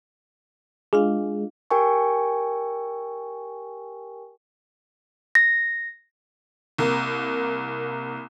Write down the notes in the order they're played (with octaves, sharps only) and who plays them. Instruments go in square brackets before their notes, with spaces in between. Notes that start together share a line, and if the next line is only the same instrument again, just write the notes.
[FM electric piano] G#3 [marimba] D4 F4 F5
[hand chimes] G4 A#4 G5 G#5 C#6
A#6
[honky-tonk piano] C2 A#3